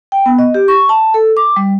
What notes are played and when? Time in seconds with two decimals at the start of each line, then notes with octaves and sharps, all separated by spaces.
0.12 G5
0.26 B3
0.39 D#5
0.54 G4
0.68 C#6
0.89 A5
1.14 A4
1.37 D6
1.56 G3